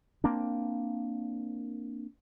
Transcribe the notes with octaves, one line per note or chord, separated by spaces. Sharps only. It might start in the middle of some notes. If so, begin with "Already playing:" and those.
A#3 C4 D4